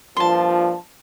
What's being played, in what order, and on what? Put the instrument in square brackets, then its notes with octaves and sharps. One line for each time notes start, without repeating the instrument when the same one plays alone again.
[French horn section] G2 A#2 F3 [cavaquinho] A5 C6